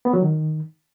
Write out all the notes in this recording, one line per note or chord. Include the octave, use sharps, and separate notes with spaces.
B3
F#3
D#3